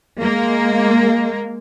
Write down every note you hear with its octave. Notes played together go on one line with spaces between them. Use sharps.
G#3 A#3